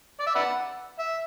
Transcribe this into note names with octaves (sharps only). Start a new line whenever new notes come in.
D5
E5
B4 D5 F#5
E5